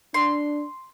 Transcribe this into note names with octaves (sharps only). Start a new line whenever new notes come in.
D4 C6